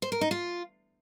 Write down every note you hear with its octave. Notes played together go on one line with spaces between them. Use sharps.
C5
A#4
D#4
F4